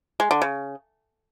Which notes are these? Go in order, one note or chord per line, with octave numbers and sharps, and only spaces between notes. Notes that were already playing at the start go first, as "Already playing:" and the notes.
G#3
D3
C#3